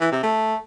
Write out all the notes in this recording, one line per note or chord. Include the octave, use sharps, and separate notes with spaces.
E3
C3
A3